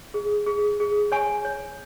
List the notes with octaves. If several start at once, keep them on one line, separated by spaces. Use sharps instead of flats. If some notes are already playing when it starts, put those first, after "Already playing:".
G#4
G#4
G#4
C#5 G#5 C#6
C#5